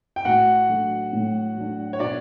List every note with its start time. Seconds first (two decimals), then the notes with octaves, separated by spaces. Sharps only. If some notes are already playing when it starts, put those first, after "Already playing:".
0.16 G5
0.25 A2 F#4 F#5
0.69 F#3 A3 D4
1.13 A2
1.56 F#3 A3 D4
1.93 C#5
1.99 B2 D4 D5